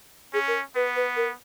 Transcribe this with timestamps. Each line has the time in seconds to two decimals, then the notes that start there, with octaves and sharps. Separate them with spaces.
0.33 C#4 G#4
0.48 A#4
0.75 B3 B4
0.96 B4
1.16 A#4